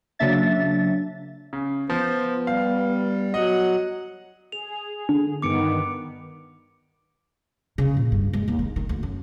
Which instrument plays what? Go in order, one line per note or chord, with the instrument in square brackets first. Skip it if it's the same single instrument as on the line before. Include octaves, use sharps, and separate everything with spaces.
[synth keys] C#3 F#3 A#3 D4 E5 A6
[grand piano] C#3
[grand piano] F3 [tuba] B3 [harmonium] C5
[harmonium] G3 [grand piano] F5
[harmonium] F#3 F#5 [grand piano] D#5
[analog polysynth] G#4 [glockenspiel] F7
[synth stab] D3
[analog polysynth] G2 D#3 B3 [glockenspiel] D6 C#7 D7
[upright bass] C#3
A#2
G2
G#3
D#2
D#3
D#3
D2
F#2